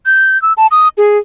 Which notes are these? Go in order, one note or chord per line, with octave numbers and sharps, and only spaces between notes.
G6
E6
A5
D#6
G#4